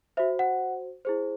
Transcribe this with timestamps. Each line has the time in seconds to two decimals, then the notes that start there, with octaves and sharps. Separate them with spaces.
0.17 F#4 C5 E5
0.39 F#5
1.05 E4 G#4 C5